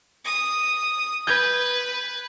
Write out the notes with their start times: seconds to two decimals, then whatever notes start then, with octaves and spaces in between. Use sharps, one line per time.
0.25 D#6
1.27 B4 G6 G#6